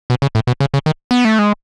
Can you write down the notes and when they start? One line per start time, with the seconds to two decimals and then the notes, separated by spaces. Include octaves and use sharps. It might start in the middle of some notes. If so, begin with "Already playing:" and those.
0.10 B2
0.22 C#3
0.35 A2
0.47 B2
0.60 C#3
0.74 C#3
0.86 D#3
1.11 B3
1.25 A3
1.39 G#3